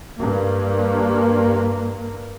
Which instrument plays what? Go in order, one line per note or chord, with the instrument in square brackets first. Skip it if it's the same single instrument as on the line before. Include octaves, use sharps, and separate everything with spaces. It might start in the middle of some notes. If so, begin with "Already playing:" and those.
[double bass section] G2 A#3